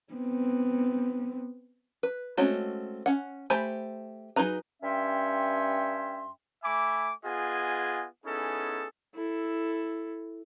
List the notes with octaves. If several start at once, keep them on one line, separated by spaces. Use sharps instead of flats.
B3 C4
B4
G#3 A3 C4 C#4 F#4
C#4 F#5
A3 G4 C5 G#5 B5
F#3 D#4 G#4 B4 A#5
G2 C#4 E5 G5 C6
A3 E5 G#5 B5 D6
B3 F4 G#4 D#5 F#5 G#5
B3 C#4 D#4 E4 G#4 A4
E4 A4